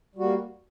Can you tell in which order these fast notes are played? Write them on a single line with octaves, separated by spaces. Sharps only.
G3 F#4 A#3